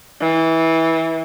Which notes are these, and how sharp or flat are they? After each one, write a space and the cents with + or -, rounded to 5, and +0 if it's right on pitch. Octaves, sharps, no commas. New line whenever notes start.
E3 -20